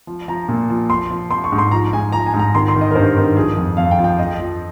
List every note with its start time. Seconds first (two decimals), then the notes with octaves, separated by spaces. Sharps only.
0.07 F3
0.28 F3 A#5
0.48 A#2
0.70 F3
0.89 F3 C6
1.10 F3
1.31 F3 C6
1.44 C#6
1.52 G#2
1.58 C6
1.71 F3 A#5
1.93 G#2 G#5
2.12 F3 A#5
2.26 G#5
2.33 G#2
2.39 A#5
2.54 D#3 C6
2.68 C6
2.75 D#3
2.81 D#5
2.91 A#4
2.95 G2 C5
3.16 D#3
3.36 F3 G#4
3.57 F2
3.77 F2 F5
3.91 G5
3.98 F3
4.04 G5
4.19 F3 D#5
4.39 F3